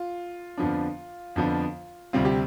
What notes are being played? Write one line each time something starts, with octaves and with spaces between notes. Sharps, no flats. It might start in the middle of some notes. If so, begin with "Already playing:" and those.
Already playing: F4
F2 D3 F3 B3 D4
F2 D3 F3 B3 D4
D2 C3 G3 C4 F4
G4